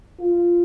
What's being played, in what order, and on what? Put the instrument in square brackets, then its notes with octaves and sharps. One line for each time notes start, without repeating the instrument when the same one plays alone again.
[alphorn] F4